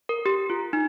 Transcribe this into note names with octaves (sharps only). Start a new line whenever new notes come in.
A#4
G4
F4
D#4